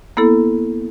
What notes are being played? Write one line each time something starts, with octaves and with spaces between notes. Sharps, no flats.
A#3 B3 E4 A4